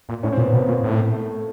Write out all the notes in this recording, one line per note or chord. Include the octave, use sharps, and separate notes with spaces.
A#2
A2 C#4
A#2 C4
B3
B2 A#3
A#2
A2
A3